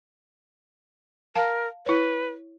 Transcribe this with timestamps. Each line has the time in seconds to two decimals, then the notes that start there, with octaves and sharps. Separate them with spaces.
1.36 A#4 F5 A5
1.86 E4 B4 C#5